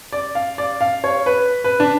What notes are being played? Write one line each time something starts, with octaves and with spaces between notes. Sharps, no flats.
D5
F5
D5
F5
C#5
B4
B4
D4